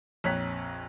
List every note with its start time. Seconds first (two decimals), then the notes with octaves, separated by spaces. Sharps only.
0.24 A#1 F2 C#5 A#5 F#6 B6